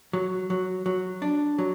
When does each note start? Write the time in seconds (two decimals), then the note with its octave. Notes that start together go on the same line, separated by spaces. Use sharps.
0.13 F#3
0.50 F#3
0.86 F#3
1.22 D4
1.59 F#3